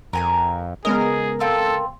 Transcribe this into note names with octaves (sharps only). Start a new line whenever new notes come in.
F2 A#4 G#5 A#5
C#3 G#3 B3 G#4 A#4 D#5
C4 F4 A4